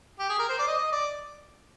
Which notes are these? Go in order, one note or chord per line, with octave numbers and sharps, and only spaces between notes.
G4
G#4
A#4
C5
D5
D#5
D#5
D5